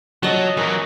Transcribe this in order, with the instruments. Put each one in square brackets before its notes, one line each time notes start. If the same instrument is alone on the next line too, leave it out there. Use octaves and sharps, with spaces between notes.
[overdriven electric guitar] F#3 [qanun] D#5 A5
[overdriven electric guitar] E3 F#3 [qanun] A#4